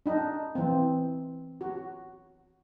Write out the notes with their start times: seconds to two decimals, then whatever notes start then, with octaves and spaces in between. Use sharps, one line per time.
0.06 D4 D#4
0.55 E3 C4
1.61 F#4